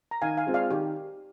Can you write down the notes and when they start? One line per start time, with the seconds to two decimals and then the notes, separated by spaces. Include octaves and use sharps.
0.11 A#5
0.22 D#3 F5 G#5
0.37 F5 G#5
0.46 G#3 C4 F4
0.54 D5 F5
0.70 D#3 G4